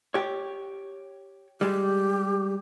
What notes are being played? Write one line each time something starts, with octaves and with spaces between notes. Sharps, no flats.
G4 C#5
G3 G#3 G4